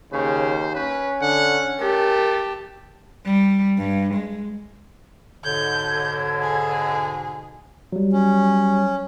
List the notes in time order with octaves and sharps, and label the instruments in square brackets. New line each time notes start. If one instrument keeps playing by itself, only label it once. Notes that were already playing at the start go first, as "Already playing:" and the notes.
[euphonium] D#2 [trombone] C#3 [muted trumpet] C5
[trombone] C#4 [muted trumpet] B4
[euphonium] D3 [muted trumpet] F#5
[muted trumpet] A3 [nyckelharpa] G4 A5 [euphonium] A#4
[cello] G3
G2
G#3
[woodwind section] G#2 B2 D3 [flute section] A4 C#5 G#6 [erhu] G6
[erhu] G#4
[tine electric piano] F#3 G3
[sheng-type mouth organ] C#4